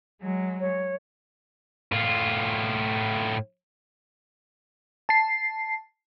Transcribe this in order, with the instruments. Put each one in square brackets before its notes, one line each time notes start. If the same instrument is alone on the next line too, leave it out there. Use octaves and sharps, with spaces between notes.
[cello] F#3 G#3
[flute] C#5
[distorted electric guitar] A2 F4
[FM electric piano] A5 C7